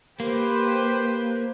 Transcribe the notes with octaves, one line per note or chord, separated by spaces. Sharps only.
A#3 G4 B4 C5